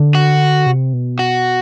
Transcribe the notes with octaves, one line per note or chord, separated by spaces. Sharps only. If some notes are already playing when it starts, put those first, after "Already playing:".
Already playing: D3
F#4
C3
B2
F#4